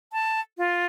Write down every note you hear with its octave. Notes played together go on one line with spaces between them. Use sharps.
A5
F4